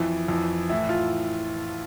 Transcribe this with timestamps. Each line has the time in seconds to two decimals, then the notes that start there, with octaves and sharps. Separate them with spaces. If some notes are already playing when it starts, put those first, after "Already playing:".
Already playing: F2 E3
0.28 F2 E3
0.69 A2 E3 E4
0.89 F4